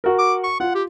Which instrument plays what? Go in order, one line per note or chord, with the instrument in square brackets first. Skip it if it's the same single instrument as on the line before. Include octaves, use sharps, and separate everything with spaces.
[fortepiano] F#4 A#4
[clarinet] D6
C#6
[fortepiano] F4 [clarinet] F#5
[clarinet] G4